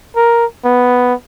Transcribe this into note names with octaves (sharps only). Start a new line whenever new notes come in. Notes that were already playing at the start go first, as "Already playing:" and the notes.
A#4
B3